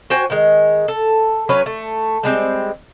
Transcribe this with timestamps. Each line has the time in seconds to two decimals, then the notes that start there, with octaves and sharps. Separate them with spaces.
0.10 F#4 C5 G5 G#5
0.30 D#3 G#3
0.88 A4
1.49 F#3 C#4 B4 C#5
1.66 A3
2.23 G3 G#3 C4